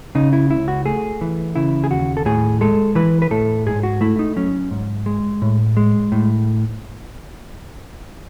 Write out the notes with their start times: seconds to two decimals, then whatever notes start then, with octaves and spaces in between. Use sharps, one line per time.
0.15 C#3 D#4
0.33 E4
0.50 C#2 E4
0.68 F#4
0.85 A3 G#4
1.21 E3
1.56 C#3 E4
1.84 G#4
1.91 D#2 F#4
2.17 A4
2.26 A2 G#4
2.61 G#3 A4
2.95 E3 B4
3.22 B4
3.31 A2 A4
3.66 G#2 G#4
3.83 F#4
4.01 A3 E4
4.19 D#4
4.36 F#3 C#4
4.71 G#2
5.06 G#3
5.42 A2
5.77 G#3
6.12 A2